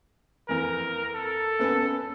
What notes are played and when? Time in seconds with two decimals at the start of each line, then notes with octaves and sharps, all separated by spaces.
0.49 F2 E3 A#4
1.15 A4
1.59 F#2 B3 C#4